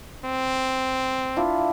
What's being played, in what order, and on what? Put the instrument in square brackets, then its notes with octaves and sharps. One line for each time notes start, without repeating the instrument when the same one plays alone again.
[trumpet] C4
[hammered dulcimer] D4 E4 F4